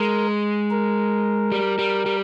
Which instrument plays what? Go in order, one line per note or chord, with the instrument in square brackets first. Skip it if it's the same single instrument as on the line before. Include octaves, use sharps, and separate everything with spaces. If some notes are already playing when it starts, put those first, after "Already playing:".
Already playing: [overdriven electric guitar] G#3 [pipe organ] A#4
[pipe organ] A#4
[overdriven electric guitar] G3
G3
G3